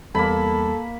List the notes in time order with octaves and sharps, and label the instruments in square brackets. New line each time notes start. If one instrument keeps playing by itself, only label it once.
[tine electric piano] E2 G3 [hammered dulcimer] A#3 B5 [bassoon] A4